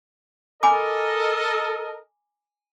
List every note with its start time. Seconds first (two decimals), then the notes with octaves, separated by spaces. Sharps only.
0.63 A4 A#4 D#5 G#5 B5 D6